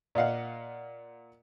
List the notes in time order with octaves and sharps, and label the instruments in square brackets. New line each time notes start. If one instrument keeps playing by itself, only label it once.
[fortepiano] A#2 D#5 F5 F#5